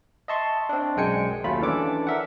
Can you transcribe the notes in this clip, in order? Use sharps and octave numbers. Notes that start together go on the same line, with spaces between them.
D#5 E5 A5 C6 C#6
C4 D4
B1 F#2 G#3 G5 G#5 C#7
D#2 F#3 A3 F4 B5
E3 C#4 D4 A4 D6
A#4 E5 F#5